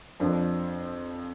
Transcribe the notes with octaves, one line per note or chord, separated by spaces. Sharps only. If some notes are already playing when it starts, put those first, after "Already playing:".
F2 F3 D4